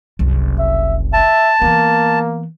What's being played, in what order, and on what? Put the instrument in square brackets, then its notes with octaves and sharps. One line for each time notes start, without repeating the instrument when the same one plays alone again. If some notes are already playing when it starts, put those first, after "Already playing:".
[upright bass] F#1 C2
[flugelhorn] E5
[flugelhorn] E5 [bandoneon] A5
[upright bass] E3 B3 [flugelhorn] A#3